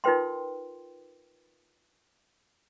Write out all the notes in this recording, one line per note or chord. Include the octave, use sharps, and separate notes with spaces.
D#4 F4 A#4 B4 G5 C6